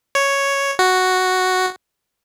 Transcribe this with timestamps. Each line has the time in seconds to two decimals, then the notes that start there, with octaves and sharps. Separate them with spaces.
0.15 C#5
0.79 F#4